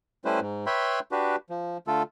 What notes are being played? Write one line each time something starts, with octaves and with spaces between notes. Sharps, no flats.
G3 A3 C#4 E4 B4 C5
G#2
B4 C#5 E5 G5 B5 C6
D4 F#4 G4 B4
F3
D3 A3 F4 A4